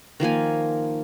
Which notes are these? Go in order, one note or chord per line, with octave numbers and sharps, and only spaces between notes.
D#3 F3 A#3 G#5